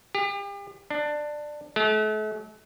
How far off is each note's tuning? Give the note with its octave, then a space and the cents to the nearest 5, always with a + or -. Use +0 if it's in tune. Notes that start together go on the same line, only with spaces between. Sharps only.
G4 +40
D4 +15
A3 -40